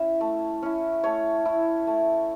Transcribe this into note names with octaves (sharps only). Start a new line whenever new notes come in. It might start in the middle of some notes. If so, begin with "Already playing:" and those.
Already playing: C#4 E4 E5
A3
C#4 E4
A3 C#5
E4
A3